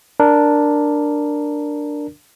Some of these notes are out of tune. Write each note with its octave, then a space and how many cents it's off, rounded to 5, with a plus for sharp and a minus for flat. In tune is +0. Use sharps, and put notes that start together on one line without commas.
D4 +0 A#4 +0